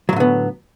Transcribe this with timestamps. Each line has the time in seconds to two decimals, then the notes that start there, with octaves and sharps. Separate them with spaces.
0.09 F#3
0.13 A2
0.16 D3
0.20 B3